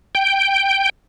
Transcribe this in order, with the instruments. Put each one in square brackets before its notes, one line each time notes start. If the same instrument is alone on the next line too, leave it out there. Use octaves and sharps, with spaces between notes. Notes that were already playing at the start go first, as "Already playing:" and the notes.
[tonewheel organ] G5